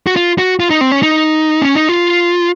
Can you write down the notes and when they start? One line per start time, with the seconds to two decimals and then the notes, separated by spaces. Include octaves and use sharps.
0.07 F#4
0.16 F4
0.38 F#4
0.60 F4
0.70 D#4
0.81 C4
0.92 C#4
1.03 D#4
1.62 C#4
1.75 D#4
1.89 F4